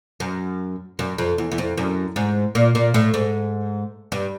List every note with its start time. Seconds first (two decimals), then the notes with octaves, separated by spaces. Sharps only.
0.20 F#2
0.99 F#2
1.18 F2
1.38 E2
1.52 E2
1.58 F2
1.78 F#2
2.16 G#2
2.55 A#2
2.75 A#2
2.94 A2
3.14 G#2
4.12 G2